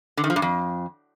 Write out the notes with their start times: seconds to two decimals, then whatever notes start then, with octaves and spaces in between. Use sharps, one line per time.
0.17 D3
0.24 D#3
0.30 F3
0.36 G2
0.42 F2